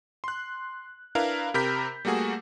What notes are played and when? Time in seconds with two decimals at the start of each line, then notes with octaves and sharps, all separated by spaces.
0.24 C6 F#6
1.15 D4 E4 A#4 B4 F5
1.54 C3 G4 A#4 B5 G6 B6
2.05 G3 A3 A#3 F#4 G#4